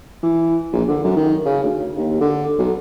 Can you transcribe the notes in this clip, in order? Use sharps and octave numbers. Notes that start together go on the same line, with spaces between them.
E3
A#1
D3
F#2
D#3
C#3
D2
D#2
D3
B1